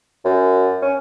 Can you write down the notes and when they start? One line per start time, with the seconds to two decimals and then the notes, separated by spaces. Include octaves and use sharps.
0.25 F#2
0.82 C#4